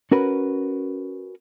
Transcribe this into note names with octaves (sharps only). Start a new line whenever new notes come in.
C#4 F#4 A#4 B4